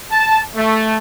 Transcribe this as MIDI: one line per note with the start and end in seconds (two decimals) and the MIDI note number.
0.12 0.41 81
0.55 0.98 57